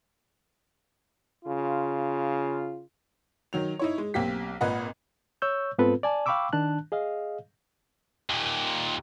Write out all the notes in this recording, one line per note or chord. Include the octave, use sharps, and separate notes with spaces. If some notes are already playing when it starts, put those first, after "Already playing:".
C#3 F4
D#3 F#3 F7
D#4 E4 C#5
G#3
B1 A#3 C4 G4 B6
G#1 A#2 B4 D#5 F#5 A#5
C#5 C#6 E6 G6
G#2 B3 C4 F4 A4 B4
D5 G#5 A5
F5 G5 B5 C#6 D6 E6
D#3 D4 A5 F#6
G#4 D#5 F5
D#2 A#2